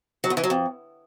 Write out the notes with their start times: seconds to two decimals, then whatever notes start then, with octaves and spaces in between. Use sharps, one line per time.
0.24 F#3
0.30 E2
0.37 E3
0.44 F#3
0.50 F2